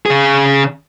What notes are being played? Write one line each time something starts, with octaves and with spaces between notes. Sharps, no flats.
C#3 G#4